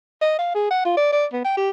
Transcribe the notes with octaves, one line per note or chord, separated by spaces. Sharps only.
D#5
F5
G#4
F#5
F4
D5
D5
B3
G5
G4